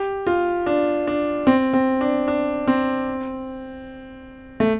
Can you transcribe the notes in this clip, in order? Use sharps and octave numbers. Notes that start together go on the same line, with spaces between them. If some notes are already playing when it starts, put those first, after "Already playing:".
Already playing: G4
F4
D4
D4
C4
C4
D4
D4
C4
A3